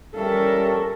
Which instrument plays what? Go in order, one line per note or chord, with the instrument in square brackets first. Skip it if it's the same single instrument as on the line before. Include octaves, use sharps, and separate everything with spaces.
[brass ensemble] G3 C#4 E5 [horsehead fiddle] A4 A#4